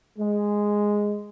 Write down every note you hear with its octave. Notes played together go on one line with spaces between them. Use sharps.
G#3